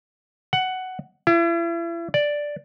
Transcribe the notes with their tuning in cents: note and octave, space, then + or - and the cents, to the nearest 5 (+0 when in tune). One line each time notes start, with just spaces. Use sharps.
F#5 +10
E4 +40
D5 +0